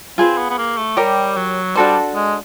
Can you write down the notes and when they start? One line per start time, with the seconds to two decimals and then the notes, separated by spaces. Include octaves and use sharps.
0.18 C4 F4 G#4 B4
0.38 B3
0.50 B3
0.58 A#3
0.78 A3
0.97 G3 G4 A#4 C#5
1.36 F#3
1.75 G3 D4 F#4 A4 C5
2.15 G#3